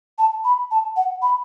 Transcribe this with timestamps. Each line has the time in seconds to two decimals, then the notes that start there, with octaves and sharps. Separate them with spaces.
0.19 A5
0.45 B5
0.71 A5
0.97 F#5
1.22 B5